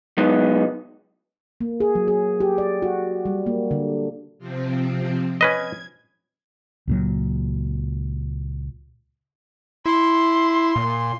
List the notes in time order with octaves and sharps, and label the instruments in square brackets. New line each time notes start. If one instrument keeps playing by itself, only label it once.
[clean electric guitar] C2 F#3 G#3 B3 D#4
[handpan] A#3
G#4
F#3
G#4
G4
D5
F#4
G3
A#3
D3
[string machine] C3 F3 C4
[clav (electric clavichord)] C#4 B4 D#5 [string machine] G#6
[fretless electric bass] C#2 A#2 F#3
[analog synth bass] E4 [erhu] C6
[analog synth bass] A#2